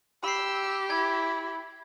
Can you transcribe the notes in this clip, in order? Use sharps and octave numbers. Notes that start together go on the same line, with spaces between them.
G4 B5 E6 C7
E4 G#6